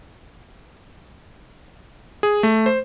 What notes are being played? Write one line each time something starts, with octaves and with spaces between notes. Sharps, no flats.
G#4
A3
C5